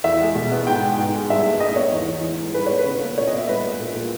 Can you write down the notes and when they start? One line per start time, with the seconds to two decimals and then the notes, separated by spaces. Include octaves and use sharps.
0.04 E2 E5
0.20 G#3
0.35 B2
0.52 B3
0.67 G#2 G5
0.83 G#3
0.98 G#2
1.14 G#3
1.30 G2 E5
1.46 A#3
1.60 G#2 D#5
1.76 B3 C#5
1.92 E2
2.07 E3
2.24 G#2
2.39 G#3
2.54 G2 B4
2.66 B3 C#5
2.79 B4
2.86 C#3
3.01 A#3
3.18 A#2 C#5
3.28 D#5
3.33 B3
3.38 E5
3.48 G2 B4
3.64 G#3
3.79 A#2
3.95 A#2